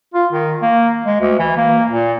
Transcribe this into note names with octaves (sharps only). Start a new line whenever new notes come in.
F4
D#3
A#3
G#3
D2
E3
A#3
A#2